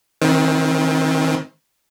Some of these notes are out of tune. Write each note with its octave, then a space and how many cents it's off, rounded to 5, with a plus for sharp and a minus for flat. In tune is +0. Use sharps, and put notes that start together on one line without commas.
D#3 +35 C4 +30